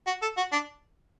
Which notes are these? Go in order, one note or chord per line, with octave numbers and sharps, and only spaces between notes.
F#4
A4
F#4
D4